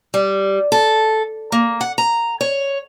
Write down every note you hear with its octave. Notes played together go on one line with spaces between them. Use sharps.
G3
A4
A#3
F#5
A#5
C#5